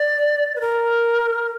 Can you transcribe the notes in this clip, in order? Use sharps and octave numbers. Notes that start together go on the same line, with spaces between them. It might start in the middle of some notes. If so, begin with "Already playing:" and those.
Already playing: D5
B4
A#4